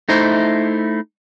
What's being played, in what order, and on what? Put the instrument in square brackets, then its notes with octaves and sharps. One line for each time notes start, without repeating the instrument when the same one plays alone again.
[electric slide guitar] A3 D#4 E4 C5